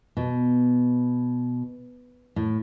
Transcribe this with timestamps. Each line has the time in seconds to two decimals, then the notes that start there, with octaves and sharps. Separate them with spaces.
0.17 B2
2.36 A2